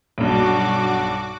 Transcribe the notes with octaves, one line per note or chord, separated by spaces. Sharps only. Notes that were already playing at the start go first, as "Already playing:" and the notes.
B1 G2 F#4 D6